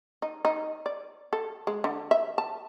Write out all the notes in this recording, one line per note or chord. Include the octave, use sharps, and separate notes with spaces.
D#4
D#4
D5
A4
G#3
D3
E5
A5